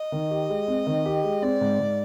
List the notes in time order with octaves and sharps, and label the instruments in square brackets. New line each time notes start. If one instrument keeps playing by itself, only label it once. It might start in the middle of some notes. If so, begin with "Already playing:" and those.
Already playing: [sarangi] D#5
[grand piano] D#3
G4
G#3
C4
D#3
G4
G#3
[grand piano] C4 [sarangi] D5
[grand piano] G#2
G#2